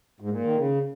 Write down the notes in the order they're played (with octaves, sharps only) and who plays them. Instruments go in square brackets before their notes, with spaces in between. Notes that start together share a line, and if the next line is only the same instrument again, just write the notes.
[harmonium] G#2
A#2
D#3
C#3